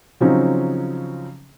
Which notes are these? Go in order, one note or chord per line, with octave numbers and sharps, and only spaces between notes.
C#3 F3 F#3 C4 C#4 D#4